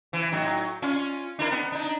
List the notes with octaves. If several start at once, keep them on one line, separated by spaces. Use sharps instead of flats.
E3
A2 F#3 D#4
C#4 F4
D4 E4 A#4
B3
D4 D#4